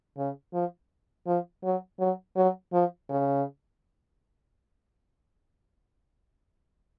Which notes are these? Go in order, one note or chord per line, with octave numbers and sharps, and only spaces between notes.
C#3
F3
F3
F#3
F#3
F#3
F3
C#3